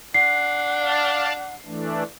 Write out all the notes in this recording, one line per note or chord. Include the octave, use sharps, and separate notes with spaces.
D4 F#5 C7
D5 F5 A5
E3 A3 D4